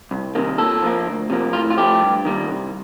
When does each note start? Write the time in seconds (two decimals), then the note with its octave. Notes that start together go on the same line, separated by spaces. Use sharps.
0.11 C2
0.35 C3 D#3 A#3
0.58 A#2 A4
0.82 F3 A#3
1.06 D2
1.30 C3 F3 A#3
1.53 A2 F4
1.70 F4
1.77 F3 A3 G4
2.01 G2
2.25 D#3 G3 A#3
2.48 C2